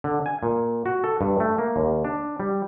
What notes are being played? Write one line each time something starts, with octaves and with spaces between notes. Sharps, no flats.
D3
G#5
A#2
F#4
A4
G2
A3
A#3
D#2
D4
G3